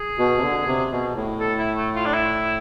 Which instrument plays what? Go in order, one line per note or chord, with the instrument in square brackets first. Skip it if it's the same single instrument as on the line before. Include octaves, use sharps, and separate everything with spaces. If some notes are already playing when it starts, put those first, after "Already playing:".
Already playing: [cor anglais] G#4
[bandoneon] B2
C3
D3
C3
B2
A2
[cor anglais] A4
E4
A3
F4
D4
E4